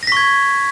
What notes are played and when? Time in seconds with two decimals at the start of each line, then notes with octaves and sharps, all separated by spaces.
0.03 A#6
0.07 B6
0.12 C#6
0.17 G#6